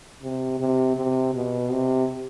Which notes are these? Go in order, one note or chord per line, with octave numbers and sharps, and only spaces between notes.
C3
C3
C3
B2
C3